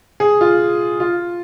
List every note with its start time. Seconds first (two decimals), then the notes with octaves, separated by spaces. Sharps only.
0.20 G#4
0.41 F4
1.00 F4